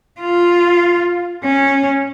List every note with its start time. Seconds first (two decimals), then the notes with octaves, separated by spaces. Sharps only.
0.21 F4
1.43 C#4